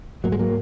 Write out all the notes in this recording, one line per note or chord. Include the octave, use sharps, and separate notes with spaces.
G#2 F#3 A#3
G#3
F#3 A#3